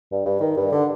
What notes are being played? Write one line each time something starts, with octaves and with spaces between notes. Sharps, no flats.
G2
G2
D#3
G2
D3